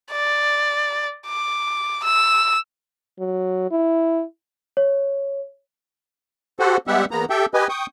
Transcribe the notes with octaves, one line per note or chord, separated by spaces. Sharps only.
D5
D6
E6
F#3
E4
C#5
F#4 G4 A4 C5 F#5
G3 G#3 B3 G4 E5 F#5
E2 A#3 B3 A#5
G4 A4 E5 G5
G4 B4 D#5 G#5
G5 C#6 D#6